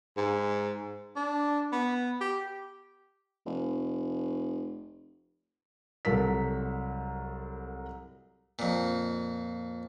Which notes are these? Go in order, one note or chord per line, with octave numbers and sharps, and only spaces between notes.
G#2
D4
B3
G4
F1
C2 F#3 A4 A#4 B6
F2 A#2